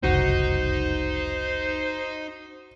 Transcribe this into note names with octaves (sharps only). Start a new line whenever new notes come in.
F#1 C2 F2 D#4 F#4 C5